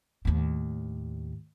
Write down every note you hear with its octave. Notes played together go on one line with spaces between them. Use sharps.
D#2 A2